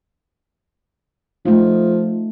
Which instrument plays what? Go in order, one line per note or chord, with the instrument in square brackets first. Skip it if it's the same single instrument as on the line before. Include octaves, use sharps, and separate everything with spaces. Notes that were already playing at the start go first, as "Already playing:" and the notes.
[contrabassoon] F3 [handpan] A3 D#4